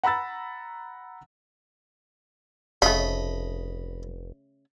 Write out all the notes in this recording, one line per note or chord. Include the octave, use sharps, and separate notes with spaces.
F#5 A#5 B5 E6 A6
F1 C#3 A3 D#5 B5